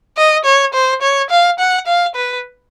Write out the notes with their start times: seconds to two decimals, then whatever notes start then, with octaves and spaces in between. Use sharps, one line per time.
0.17 D#5
0.45 C#5
0.74 C5
1.02 C#5
1.30 F5
1.59 F#5
1.87 F5
2.15 B4